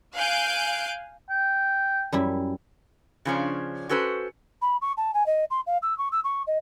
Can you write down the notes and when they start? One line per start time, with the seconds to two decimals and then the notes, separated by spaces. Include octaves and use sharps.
0.14 F5 G#5 F#6 G6 D7
1.30 G5
2.12 F#2 G3 E4
3.25 C#3 F3 C#4 D4
3.89 C#4 F#4 A4 B4 C5
4.62 B5
4.81 C#6
4.97 A5
5.14 G#5
5.26 D#5
5.50 C6
5.67 F5
5.82 E6
5.98 C#6
6.12 E6
6.24 C#6
6.47 D#5